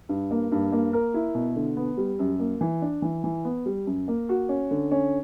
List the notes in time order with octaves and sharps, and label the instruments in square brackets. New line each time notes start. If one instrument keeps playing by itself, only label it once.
[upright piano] G2
A#3
G2
A#3
A#4
E4
B2
D3
B3
G3
F#2
A#3
E3
D4
E3
E3
B3
G3
F#2
A#3
F#4
C#4
D3
C#4